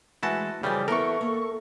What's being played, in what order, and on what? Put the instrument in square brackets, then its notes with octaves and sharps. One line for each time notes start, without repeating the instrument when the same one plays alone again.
[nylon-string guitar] E3 G#3 A3 [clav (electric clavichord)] E4 F#4 A5
[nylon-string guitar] F#2 E3 F3 [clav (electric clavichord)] C#3 G3
[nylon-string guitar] E3 B3 E4 [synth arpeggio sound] A4 C#6 [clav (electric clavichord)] A#4
[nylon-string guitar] A#3